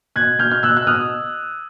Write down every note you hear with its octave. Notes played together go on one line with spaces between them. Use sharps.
B2 F#6 G#6
B2 F6 G6
F6
B2 E6 F#6
F#6
B2 D#6 F6